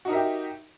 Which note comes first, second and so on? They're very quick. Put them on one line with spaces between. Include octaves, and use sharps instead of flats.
F#4 D#4 A#4 E5 G4